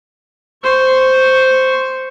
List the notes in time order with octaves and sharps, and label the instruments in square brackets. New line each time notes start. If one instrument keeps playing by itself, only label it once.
[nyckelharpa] C5 C#6